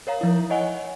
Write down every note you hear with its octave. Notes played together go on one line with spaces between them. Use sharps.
A#4 C#5 F5 A#5
F3 E4
C#5 D#5 F#5 G#5